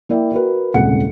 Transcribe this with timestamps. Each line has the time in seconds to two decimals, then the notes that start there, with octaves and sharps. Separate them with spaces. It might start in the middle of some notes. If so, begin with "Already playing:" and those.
0.09 A#3 E4 D5 E5 G5
0.32 F#4 A#4 B4
0.74 D#1 C2 C#3 G#3 F#5 C#7